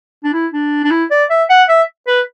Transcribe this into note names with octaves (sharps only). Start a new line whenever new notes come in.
D4
E4
D4
D4
E4
D5
E5
F#5
E5
B4